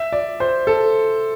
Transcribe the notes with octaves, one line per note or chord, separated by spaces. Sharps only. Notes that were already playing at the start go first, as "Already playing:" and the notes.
Already playing: E5
D5
C5
A4